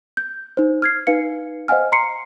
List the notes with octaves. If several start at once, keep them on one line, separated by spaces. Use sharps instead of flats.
G6
D#4 C5
F6 G#6 C7
D#4 B4 F5 C#7
C5 D#5 F5 F#5 G#5 F6
A#5 C6 C7 C#7